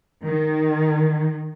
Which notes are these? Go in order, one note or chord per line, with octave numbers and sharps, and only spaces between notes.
D#3